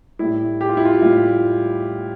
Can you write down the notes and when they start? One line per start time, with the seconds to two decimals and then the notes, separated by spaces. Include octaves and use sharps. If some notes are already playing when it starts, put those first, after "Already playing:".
0.19 A2 G3 E4
0.61 G4
0.69 F4
0.77 E4
0.85 F4
1.02 A2 G3 F4